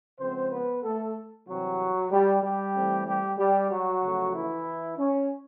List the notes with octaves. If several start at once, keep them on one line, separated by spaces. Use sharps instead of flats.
C#3 F3 G#3 B3 C4 C5
B3 B4
A3 A4
C3 E3 F#3 G3 C4 F#4
G3 G4
G3 G4
E3 A3 C4
G3 G4
G3 G4
F#3 F#4
C#3 F3 A3
E3 E4
C#4